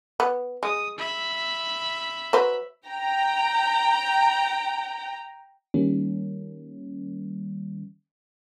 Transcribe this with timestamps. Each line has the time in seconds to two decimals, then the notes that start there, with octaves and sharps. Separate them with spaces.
0.20 B3
0.63 G#3 D#6
0.98 E5 B5
2.33 F#3 B4 C5
2.88 G5 A#5
5.74 D#3 G3 A#3 C#4